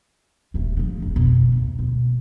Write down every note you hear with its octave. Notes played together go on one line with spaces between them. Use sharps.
D#1 A3
C#3 F3
D1 F2
F2 B2
D2
B2